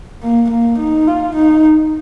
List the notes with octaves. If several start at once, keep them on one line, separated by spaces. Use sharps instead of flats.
A#3
A#3
D#4
F4
D#4